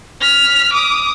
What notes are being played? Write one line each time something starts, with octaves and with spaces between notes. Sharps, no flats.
F6 B6
D6 D#6